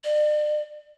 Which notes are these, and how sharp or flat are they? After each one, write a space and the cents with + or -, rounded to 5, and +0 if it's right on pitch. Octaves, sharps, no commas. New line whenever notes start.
D5 +40